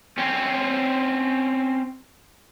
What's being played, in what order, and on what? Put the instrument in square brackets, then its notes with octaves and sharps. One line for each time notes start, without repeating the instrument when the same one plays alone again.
[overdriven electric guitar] C4 C#4